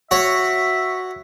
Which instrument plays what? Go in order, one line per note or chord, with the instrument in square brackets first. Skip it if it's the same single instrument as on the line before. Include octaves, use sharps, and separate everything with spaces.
[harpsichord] F#4 C#5 [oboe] E5